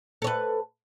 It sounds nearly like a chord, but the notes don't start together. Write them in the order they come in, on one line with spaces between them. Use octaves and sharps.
A4 C#5 B4